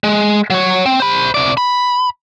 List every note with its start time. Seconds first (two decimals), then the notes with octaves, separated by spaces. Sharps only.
0.04 G#3
0.50 F#3 C#5
0.86 C4
1.00 C5 B5
1.34 C3 D5
1.57 B5